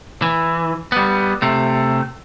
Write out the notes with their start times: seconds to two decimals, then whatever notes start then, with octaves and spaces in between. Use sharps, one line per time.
0.22 E3
0.92 G3 B3
1.42 C3 A3